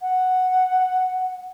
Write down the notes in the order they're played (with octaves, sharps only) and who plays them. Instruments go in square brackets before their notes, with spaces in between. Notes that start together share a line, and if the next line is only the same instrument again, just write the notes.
[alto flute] F#5